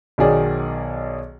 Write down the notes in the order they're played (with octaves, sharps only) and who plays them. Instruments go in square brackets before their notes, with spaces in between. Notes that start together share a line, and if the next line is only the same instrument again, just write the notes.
[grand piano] B1 D#3 F#3 G#4 D5